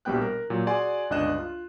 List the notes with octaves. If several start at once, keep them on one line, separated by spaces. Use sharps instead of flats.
A#1 B2 G3 B3 G5 F#6
A#4
A#2 F#3
F#4 G#4 D5 F#5 G#5 C6
G1 C#2 D4 D#5 F#6 E7
F4